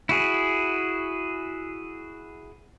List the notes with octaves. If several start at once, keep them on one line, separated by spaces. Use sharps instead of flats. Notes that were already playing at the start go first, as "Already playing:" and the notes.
E4 F#4 G#4